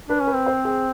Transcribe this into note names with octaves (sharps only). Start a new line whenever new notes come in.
D4 B4
C#4
B4
C4
C5
G#4